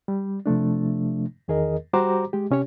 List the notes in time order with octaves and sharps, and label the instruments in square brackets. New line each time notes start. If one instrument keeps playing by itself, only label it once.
[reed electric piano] G3
C3 F3 A3 D4
E2 D#3 G#4 A#4 D#5
G3 F#4 G4 C5 A#5 D6
G#3 G4
C3 C#4 G4 C#5